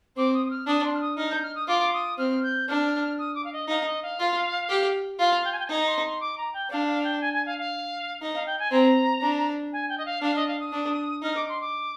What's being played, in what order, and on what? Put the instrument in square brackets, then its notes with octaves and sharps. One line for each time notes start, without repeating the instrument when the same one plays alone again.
[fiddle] C4 [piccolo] D6
[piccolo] D#6
D#6
F6
[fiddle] D4 [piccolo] D#6
[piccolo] C6
F6
D#6
[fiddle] D#4 [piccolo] F6
[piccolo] G6
F6
D#6
[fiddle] F4 [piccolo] D6
[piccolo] D#6
[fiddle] C4 [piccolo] F6
[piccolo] G6
[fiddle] D4 [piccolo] F6
[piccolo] D#6
D6
F5
D#5
[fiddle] D#4 [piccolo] F5
[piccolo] D#5
F5
[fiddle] F4
G4
[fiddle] F4 [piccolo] F5
[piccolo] G5
G#5
G5
G#5
[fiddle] D#4 [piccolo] A#5
[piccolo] C6
C6
D6
A#5
G5
[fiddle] D4 [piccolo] F5
[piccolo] F5
G5
G#5
G#5
F5
F5
[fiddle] D#4
[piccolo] F5
G5
G#5
[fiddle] C4 [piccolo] A#5
[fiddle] D4
[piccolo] G#5
G5
D#5
F5
[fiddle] D4 [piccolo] F5
[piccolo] D#5
F5
D#6
[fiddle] D4
[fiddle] D#4 [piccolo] F6
[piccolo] D6
C6
D6